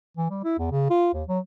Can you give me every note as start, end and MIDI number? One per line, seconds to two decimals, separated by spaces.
0.17 0.29 52
0.31 0.43 55
0.44 0.59 64
0.59 0.70 40
0.72 0.89 49
0.90 1.13 65
1.14 1.23 39
1.28 1.39 54